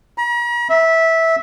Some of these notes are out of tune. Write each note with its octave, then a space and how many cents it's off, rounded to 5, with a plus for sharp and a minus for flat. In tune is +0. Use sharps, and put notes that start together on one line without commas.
A#5 +45
E5 -15